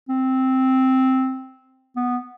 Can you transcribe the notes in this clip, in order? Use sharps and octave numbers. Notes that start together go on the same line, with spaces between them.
C4
B3